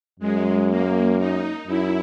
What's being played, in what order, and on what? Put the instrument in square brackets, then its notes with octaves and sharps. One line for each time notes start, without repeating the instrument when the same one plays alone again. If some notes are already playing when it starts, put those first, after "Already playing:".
[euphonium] F#2 [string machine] G#3
[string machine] A#3
D#4
[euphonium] F#2 [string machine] E4